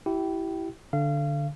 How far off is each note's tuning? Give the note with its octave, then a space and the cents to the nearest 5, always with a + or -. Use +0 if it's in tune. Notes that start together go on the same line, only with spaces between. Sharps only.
E4 +0 G4 -30 G5 -20
D3 +0 F5 -30